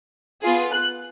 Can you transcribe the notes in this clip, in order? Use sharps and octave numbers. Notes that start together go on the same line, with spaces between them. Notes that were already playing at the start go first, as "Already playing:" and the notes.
B3 F4 G#4
F#6